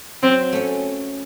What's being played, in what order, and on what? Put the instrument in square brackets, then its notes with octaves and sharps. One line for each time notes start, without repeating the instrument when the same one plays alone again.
[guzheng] F#3 [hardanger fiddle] C4
[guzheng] A3 C#4